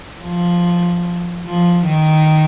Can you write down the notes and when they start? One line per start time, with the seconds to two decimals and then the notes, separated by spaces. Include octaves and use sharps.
0.21 F3
1.46 F3
1.86 D#3